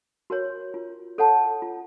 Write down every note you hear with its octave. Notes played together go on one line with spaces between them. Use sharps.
F#4 A#4 C#5
F4
A4 C#5 F#5 A5
F4